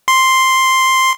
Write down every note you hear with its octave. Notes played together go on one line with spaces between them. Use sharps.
C6